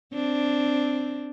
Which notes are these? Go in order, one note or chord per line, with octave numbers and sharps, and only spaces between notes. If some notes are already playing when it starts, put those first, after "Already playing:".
C4 D4